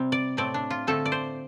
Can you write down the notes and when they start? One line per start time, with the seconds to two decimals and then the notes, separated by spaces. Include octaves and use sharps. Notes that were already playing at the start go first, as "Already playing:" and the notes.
Already playing: C3 G3 C4
0.12 D5
0.37 A2 A3 C4 D5
0.54 D4
0.70 F4
0.87 D3 A3 C4 A4
1.05 D5
1.12 C5